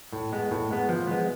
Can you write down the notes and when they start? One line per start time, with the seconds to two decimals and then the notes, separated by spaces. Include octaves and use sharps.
0.13 A2
0.32 G#3 B3
0.51 A2
0.71 G#3 B3
0.89 F3
1.07 G#3 B3